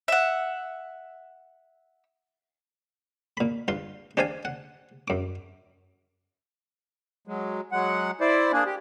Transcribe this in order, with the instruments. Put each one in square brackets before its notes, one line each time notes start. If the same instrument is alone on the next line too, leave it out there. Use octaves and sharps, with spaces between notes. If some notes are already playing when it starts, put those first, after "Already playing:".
[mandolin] E5 F#5
[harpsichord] A#2 B5
G2 F4 C6
D4 G4 C5 D5 F5 G#5
F#5
F#2 D6
[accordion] F#3 G#3
F#3 G#3 F#5
E4 C5 D5
A#3 D4 G#4
G4